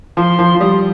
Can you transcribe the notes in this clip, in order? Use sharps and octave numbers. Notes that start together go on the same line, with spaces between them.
F3 C6
F3
F3
G3 D#6